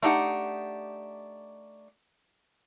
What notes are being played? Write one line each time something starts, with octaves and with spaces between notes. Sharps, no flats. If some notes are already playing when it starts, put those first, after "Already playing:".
A3 D4 D#4 G4 F#5